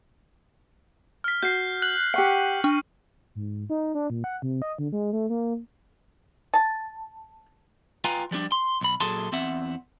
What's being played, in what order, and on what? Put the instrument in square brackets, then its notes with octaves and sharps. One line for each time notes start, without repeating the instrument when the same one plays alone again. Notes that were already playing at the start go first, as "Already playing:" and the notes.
[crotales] F6 B6
[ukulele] F#4 [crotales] G6 C7
[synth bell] F#6 [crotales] F#7
[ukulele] G4 F#5 [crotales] C#6 C#7
[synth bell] D4 [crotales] C#6
[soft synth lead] G#2
D#4
D4
A#2
F#5
C3
D#5
D3
G#3
A3
A#3
[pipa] A5
[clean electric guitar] F4 B4 F5 G5 G#5 A#5
F3 G3 A3 D4
C6
B1 B5
A#2 F#3 G#4 A4 A5 C6
E2 C4 E5 F#5